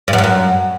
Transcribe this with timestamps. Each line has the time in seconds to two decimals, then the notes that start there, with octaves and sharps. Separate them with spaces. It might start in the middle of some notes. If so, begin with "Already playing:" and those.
0.08 G2
0.13 F#2
0.18 G2
0.24 F#2